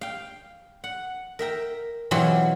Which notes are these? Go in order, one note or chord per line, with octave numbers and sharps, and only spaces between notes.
F5 G5
F#5
A#4 E5 G5 A#5
B2 E3 F#3 C4 F4 G4